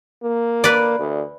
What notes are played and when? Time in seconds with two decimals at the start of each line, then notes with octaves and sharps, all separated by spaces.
0.23 A#3
0.64 B4 D5
1.00 D2